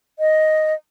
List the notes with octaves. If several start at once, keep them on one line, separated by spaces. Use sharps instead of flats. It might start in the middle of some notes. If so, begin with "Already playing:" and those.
D#5